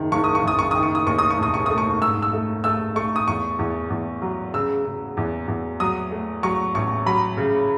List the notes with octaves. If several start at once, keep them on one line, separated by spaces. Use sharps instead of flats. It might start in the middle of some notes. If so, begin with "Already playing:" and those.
Already playing: F#1 D#3
F#1 C#6
D#6
C#6
F#1 D#6
C#6
D#3 D#6
C#6
D#6
D#2 C#6
D#6
C#6
E1 D#6
C#6
A3 D#6
C#6
G#2 E6
E6
A3
A3 E6
A3 C#6
D#6
E2 C#6
E2
E2
F#3
C#3 E6
C#3
E2
E2
F#3 D#6
A3
F#3 C#6
A1 C#6
F#3 B5
C#3